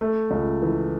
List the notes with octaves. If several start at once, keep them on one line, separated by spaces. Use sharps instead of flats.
A3
C#2
E3